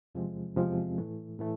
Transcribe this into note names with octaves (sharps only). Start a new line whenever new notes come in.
E2 C3 F3 G#3 C4
E2 C3 F3 G#3 C4
A2 E3 A3
A2 E3 A3